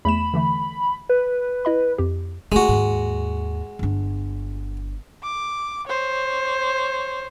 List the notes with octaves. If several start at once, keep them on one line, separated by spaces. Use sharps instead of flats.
E2 A3 B5 E7
D3 E3 A3
B4
E4 D#5 B5
F2 G4
G#3 A3 E4 F#4
D#2 G#2
G1 D4
D6
C5 C#5